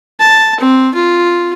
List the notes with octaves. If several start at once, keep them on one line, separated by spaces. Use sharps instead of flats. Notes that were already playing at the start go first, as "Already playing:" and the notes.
A5
C4
F4